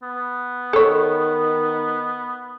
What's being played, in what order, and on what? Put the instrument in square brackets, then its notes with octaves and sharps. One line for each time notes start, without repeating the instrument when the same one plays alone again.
[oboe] B3
[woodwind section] D#3 [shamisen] A4 C#5